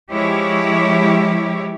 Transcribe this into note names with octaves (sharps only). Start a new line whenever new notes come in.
F3 G#3 E4 G4 C#5